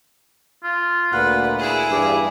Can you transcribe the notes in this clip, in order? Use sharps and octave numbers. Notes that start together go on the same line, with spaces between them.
F4
D2 A#2 B4 F#5
E4 G#4
E2 G2 D5